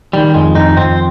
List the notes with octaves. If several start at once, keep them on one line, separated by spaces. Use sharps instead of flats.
D#3 G3
F2 G#3
F2 D#4
F2 C4